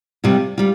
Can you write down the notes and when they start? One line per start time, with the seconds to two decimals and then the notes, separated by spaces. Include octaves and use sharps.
0.24 C3 G3 F4
0.58 G3 F4